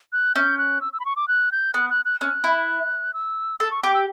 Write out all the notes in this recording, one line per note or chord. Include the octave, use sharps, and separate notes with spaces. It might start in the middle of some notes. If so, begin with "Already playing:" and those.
F#6
C#4 G6
F#6
E6
E6
B5
C#6
D6
F#6
G6
B3 F#6
F#6
F#6
C#4 F#6
E4
E6
A4 E6
C#6
G4 D6
E6